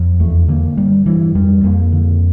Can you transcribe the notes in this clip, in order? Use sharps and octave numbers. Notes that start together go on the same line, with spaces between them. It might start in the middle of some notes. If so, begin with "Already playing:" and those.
Already playing: F2
E2 A3
D3 A#3
G2 G3
G2 E3
F2 G3
F2 A#3
D3